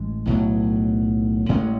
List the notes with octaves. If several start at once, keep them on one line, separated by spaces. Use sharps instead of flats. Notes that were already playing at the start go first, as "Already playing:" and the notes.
Already playing: A1 G#3
B1 A2 F#3
A1 A2 G#3 C#4